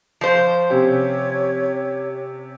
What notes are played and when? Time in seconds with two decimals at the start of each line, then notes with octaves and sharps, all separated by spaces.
0.21 F3 C5
0.70 C3 C#4 G4 C#5